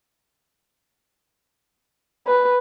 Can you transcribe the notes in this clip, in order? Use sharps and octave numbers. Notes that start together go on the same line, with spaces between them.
B4